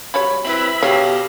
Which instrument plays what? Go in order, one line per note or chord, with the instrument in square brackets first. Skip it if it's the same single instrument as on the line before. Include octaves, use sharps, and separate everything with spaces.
[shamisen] F#3 G3 C#5 [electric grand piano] B5
[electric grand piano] C4 E4 B4 [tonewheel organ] E5 B5
[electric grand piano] B2 F5 [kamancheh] G4 [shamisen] C#5